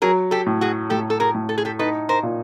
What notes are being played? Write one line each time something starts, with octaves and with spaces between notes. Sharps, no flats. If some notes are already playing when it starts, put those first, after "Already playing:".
F#3 G#4 A#4
G4 A4
A2
F#4 G#4
A2 G4 A4
A4
G#4 A#4
A2
A4
G#4
G4 A4
D#4 A4 B4
A#4 C5
A#2